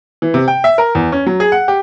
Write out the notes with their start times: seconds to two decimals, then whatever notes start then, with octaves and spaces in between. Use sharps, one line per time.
0.22 E3
0.34 C3
0.48 G5
0.64 E5
0.78 A#4
0.95 E2
1.12 C#4
1.27 F#3
1.40 G#4
1.52 F#5
1.68 G4